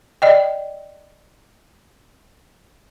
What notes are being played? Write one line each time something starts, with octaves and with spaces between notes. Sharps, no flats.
D5 D#5 G5